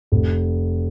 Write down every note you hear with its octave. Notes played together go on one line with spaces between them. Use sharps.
F1